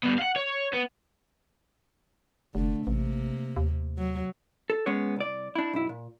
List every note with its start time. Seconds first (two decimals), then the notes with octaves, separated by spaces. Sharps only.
0.03 G3 B3
0.18 F5 F#5
0.36 C#5
0.73 B3
2.55 F1 D3 A3
2.87 A1 C3 A#3
3.56 D#2
3.98 F#3
4.70 A4
4.86 G#3 B3 C#4 C#5
5.16 C2 D5
5.55 D4 E4
5.73 B1 F#2 E4
5.89 A#2